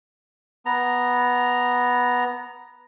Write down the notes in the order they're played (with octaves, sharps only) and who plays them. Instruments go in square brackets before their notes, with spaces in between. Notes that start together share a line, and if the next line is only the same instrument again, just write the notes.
[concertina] B3 A#5